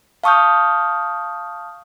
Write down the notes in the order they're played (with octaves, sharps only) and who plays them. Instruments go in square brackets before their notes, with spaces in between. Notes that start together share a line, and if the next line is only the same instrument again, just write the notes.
[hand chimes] F5 A5 C#6 D#6 F6 G6